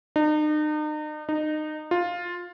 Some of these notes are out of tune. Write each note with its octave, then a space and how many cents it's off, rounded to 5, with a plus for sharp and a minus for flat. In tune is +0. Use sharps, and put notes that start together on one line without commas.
D#4 -40
D#4 -25
F4 +5